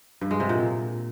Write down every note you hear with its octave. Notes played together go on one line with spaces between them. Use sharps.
G2
G#3
C3
A#2